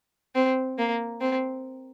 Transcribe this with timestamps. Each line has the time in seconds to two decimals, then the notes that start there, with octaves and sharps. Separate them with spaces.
0.35 C4
0.78 A#3
1.21 C4